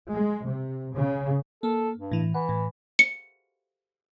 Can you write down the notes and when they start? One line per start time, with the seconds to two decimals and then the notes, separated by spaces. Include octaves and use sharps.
0.12 G#3
0.44 C3
0.93 C#3
1.63 A#3 A4
1.97 G2
2.12 A2 E3
2.34 E3 F#5
2.49 A2
2.99 C#7